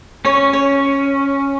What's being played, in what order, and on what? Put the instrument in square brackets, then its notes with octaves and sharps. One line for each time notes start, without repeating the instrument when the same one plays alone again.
[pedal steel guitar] C#4 [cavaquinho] C#5
[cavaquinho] C#5